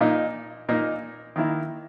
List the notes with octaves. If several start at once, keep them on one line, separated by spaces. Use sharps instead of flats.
A#2 A#3 D#4
A#2 A#3 D#4
D#3 A#3 E4